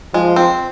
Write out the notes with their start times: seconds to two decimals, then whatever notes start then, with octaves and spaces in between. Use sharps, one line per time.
0.14 F3 G#3
0.36 C4